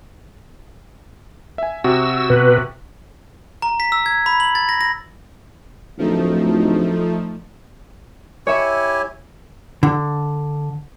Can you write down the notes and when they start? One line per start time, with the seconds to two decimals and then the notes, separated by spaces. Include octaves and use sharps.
1.58 E5 G#5
1.84 C3 F#4 E6
2.30 B2 B4
3.62 A#5
3.80 B6
3.92 E6
4.06 G#6
4.26 B5
4.40 F#7
4.55 A6
4.69 A#6
4.81 A#6
5.98 D1 F3 A3 D#4
8.47 E4 G4 C#5 E5 G#5 C#6
9.83 D3